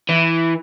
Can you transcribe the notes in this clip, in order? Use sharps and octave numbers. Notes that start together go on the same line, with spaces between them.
E3